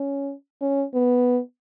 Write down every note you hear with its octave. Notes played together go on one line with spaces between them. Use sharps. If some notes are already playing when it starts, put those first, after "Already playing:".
Already playing: C#4
C#4
B3